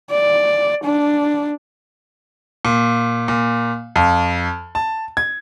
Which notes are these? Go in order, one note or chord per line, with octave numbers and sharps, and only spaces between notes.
D5
D4
A#2
A#2
F2
A5
G#6